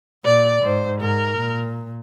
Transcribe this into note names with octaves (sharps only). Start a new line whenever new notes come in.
A#2 D5
G#2 C5
G#2 A#4
A#2